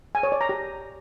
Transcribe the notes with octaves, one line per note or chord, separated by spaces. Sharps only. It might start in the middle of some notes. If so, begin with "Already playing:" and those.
G#5
C#5
D5
A#5
G4